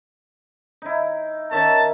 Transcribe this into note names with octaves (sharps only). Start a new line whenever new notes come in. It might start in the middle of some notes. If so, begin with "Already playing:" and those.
D#4 E4
D#3 C#4 E5 A5